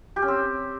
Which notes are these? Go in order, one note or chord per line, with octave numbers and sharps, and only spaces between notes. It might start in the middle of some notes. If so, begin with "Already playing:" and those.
G4
C#4
C4